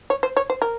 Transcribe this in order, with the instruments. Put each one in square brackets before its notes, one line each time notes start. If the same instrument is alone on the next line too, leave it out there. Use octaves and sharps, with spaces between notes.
[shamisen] C#5
C5
C#5
C5
A#4